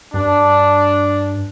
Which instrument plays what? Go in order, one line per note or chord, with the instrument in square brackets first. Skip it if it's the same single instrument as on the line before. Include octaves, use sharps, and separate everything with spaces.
[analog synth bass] G2 [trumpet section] D4